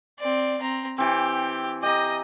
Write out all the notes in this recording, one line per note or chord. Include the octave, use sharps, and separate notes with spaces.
C4 D5
C4 A#5
E3 C4 G4
G4 D#5 A#5 D#6